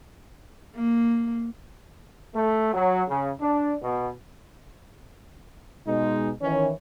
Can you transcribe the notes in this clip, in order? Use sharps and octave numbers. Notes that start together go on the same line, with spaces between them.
A#3
A3
F#3
C#3
D4
B2
B2 G#3 D#4
D#3 E3 C#4 C#5